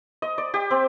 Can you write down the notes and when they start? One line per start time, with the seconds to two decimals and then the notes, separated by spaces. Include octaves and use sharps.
0.22 D#5
0.38 D5
0.54 G4
0.71 C4